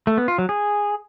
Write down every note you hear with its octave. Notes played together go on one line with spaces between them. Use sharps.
A3
B3
F4
F#3
G#4